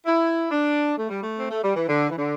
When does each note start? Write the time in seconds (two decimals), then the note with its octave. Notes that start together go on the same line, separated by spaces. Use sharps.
0.06 E4
0.51 D4
0.97 A3
1.08 G3
1.21 A3
1.37 C4
1.49 A3
1.63 G3
1.75 E3
1.87 D3
2.10 E3
2.16 D3